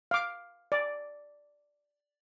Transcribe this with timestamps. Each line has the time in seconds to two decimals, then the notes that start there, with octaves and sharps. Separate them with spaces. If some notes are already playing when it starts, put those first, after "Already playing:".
0.11 F5 D6
0.72 D5